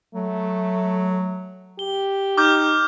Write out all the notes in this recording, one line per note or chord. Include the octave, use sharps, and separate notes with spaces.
F#3 A3
G4 G7
D#4 D6 F6 G6